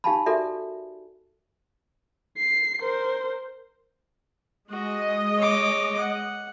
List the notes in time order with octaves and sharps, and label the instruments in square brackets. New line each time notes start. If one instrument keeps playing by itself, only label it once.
[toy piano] D#4 G4 F5 G#5 A5 B5
F#4 G4 A4 A#4 D5 E5
[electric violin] C7
A#4 C5
[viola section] G#3 D#5 [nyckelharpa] F#4
[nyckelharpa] C#5 D6
F#5